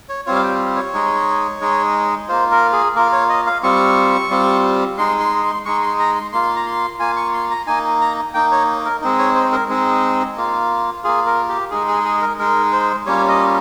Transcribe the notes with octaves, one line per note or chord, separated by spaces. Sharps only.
C#5
G3 C4 F4 C#5
F5
G5
C#5
G#3 D#4
G#3 D#4
A#3 F4 C5
A#4
G#4
A#3 F4 A#4
C#5
D#5
F5
G3 C4 F4 C#6
G3 C4 F4
G#3 D#4 C6
C6
C6
G#3 D#4 C#6
C6
A#5
C6
A#3 F4 C6
A#5
C6
A#3 F4 G#5
C#6
C6
A#5
A#3 D#4 G#5
A#5
A#3 D#4 G5
C#5
A#4
G#3 C4 D#4
C#5
C5
A#4
G#3 C4 D#4
A#3 F4
A#3 F4 G#4
A#4
G4
G#3 D#4 G#4
G#4
G#4
A#4
G#3 D#4 A#4
C5
G3 A#3 C#4 F4 C#5
D#5